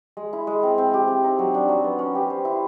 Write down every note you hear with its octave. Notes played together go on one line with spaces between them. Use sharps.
G#3
E4
G#3
C4
C4
G4
C4
D#4
F#3
D4
F#3
B3
C#4
G4
C5
E4